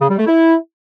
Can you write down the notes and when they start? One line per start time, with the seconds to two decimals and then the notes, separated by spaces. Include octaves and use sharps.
0.01 C#3
0.10 G3
0.18 A3
0.27 E4